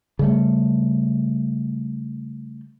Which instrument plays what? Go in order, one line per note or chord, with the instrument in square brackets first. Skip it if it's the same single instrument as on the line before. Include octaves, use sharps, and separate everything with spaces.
[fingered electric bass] C#3 G3 A3